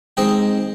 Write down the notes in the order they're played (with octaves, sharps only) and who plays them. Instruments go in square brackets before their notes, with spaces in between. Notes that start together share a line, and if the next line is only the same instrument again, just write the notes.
[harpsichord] D#3 G#3 C4 D#5 G5